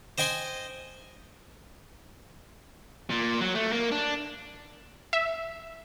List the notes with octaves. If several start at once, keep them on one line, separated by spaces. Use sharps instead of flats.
C5 D#5 G5 G#5 C6
A#2
F#3
A3
A#3
D4
E5